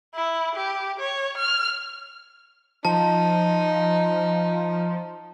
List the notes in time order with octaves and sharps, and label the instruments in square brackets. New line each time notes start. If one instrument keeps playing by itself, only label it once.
[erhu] E4
G4
C#5
F6
[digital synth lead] F3 [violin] D#4 [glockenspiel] A5